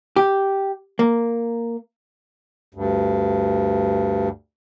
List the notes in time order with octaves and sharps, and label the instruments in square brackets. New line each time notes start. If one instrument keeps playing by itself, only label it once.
[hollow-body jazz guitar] G4
A#3
[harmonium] D2 G2